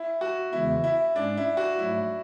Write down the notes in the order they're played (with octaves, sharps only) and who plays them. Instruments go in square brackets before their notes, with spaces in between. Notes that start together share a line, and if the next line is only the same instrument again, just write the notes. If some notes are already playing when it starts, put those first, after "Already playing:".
Already playing: [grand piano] E4
F#4
[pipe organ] E2 C#3 E3 G#3 B3 [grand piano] E4
[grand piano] E4
[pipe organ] G#2 G#3 C#4 [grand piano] D4
[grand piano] E4
F#4
[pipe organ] G#2 F#3 A3 [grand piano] E4